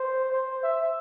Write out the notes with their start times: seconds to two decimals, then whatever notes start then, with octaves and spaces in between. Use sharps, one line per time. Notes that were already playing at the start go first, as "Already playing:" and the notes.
Already playing: C5
0.32 C5
0.63 E5